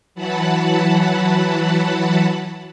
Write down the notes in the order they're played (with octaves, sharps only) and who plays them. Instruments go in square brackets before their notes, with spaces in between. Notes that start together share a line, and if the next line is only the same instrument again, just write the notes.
[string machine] E3 F#3 F#5 A5 B5